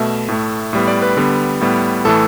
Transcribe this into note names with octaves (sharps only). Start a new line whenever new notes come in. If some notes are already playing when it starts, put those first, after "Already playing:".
Already playing: B2 A3 E5
A2 A3
A2 G3 B3
D5
B4
D3 G3 B3
A2 G3 B3
A2 E3 A3 A4